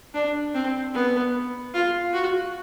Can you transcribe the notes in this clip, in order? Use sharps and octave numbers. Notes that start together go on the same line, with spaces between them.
D4
C4
B3
F4
F#4